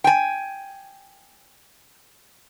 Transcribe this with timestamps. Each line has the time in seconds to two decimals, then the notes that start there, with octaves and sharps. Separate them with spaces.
0.04 G5 G#5